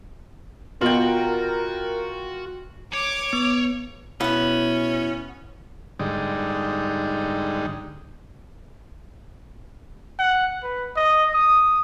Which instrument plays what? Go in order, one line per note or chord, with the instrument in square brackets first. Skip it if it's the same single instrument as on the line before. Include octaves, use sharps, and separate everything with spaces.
[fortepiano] B2 [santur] F4 G5 [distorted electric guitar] F#4 [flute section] A#4
[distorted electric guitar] C#5 [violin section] D6
[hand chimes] B3
[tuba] B2 [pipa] B3 [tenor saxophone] C#4 [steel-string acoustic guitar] E4 F#5
[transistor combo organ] G#2 D3 G3 D#4
[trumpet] F#5
B4
D#5
D#6